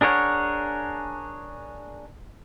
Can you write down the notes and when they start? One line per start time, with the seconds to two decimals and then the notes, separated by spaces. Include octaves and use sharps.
0.01 D4 G#4 A#4 C#5 F#5